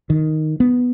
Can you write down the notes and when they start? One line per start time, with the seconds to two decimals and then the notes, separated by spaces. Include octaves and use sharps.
0.10 D#3
0.60 B3